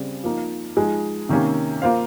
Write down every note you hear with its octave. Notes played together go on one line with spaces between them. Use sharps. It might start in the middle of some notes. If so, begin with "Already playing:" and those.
Already playing: C#3 G3 C4
F3 A#3 D#4
F3 G#3 D#4 G#4
C3 D#3 A#3 C#4
A#3 F4 C5 F5